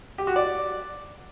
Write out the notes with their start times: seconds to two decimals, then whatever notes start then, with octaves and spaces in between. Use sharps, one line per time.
0.18 G4
0.27 F#4
0.36 D5